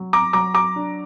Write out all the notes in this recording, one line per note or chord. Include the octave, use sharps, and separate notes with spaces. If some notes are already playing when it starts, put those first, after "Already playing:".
Already playing: F#3
A#5 D6
F#3 A#5 D6
A#5 D6
D4